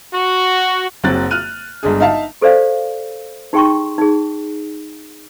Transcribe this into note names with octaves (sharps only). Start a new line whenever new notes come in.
F#4
F#1 F#3 C4 F#6 A6
F6 F#6 D#7
G1 G#3 D4 G#4
D#4 E5 F5 A5
G4 A4 C5 D5 F5
D#4 G4 G#4 G5 C6 C#6
D#4 G#4